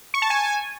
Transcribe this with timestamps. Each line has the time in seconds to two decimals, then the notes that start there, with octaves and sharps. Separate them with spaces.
0.14 C#6
0.22 A5
0.30 G#5